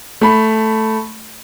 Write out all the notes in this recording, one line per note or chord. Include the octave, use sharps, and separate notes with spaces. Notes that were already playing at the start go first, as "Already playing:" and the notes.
A3 B5